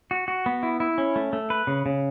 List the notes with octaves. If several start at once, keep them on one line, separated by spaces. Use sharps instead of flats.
F#4
F#4
B3
E4
E4
C#4
A3
A3
B4
C#3
C#3